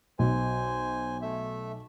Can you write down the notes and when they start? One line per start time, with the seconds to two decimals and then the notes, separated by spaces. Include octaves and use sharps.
0.19 B1 C5 G#5
1.22 A3 E5